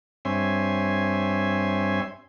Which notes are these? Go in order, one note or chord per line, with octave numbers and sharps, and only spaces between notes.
G2 C4 C#5 E5 G#5 C6